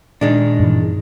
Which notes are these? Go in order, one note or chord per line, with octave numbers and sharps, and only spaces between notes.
A#2 D#3 G#3 D4
G2 E3